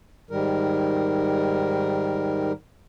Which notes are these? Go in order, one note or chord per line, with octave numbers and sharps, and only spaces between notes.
G#2 D#3 G3 A#4